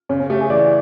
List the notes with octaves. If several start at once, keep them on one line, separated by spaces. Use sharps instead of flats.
C#3 C#4
C#4
A3 G4
G#4
E3 D5